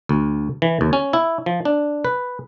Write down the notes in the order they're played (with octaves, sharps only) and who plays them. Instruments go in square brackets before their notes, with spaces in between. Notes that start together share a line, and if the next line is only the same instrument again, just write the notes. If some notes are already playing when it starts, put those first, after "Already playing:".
[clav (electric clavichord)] D2
E3
D#2
C#4
E4
F3
D4
B4